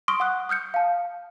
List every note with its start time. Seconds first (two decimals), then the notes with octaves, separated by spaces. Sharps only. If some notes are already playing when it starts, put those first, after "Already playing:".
0.08 C6 C#6 D#6 F6 D7 G7
0.20 F#5 D6 D#6 F#6
0.49 D#6 F6 G6 C#7
0.74 F5 A5